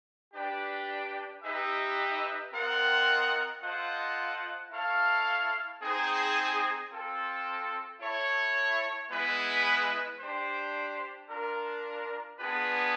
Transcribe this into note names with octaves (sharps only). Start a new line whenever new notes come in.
D4 G4 B4 D5 G5
D#4 G4 B4 E5
C4 F4 A#4 D#5 F#5
F4 A4 C5 D#5 F#5
E4 A4 C#5 F5
C4 D#4 G#4 C5
C4 F4 A4
E4 A4 C#5
G#3 B3 E4 G#4 B4
D4 G4 C5
D4 F4 A#4
B3 D4 F4 G#4 B4